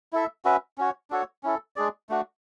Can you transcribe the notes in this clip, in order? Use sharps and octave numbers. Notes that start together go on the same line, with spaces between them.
E4 A4 E5
C#4 F#4 B4 E5
C#4 F#4 C#5
D4 F#4 A4 C#5
C#4 E4 A4
G#3 D4 G#4 D5
A3 D4 F#4